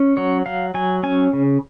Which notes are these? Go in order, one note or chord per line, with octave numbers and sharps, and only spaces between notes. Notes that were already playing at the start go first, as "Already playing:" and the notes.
Already playing: C#4
F#3 C#5
F#3 F5
F#3 G#5
C#4 G#5
C#3